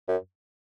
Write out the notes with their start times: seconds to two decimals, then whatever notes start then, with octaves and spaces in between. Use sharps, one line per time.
0.08 F#2